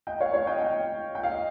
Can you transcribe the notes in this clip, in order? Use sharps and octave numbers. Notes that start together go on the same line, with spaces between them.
D#5 G5
C#5 F5
C#5 F5
D#5 G5
D#5 G5
G5
F5
D#5